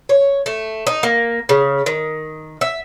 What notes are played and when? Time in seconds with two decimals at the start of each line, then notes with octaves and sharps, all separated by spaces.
0.09 C#5
0.46 A3
0.87 D#4
1.03 A#3
1.49 C#3
1.86 D#3
2.61 E5